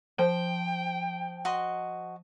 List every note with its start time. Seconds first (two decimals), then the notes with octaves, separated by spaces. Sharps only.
0.19 F3 C5 G5
1.45 F#4 D#5 C6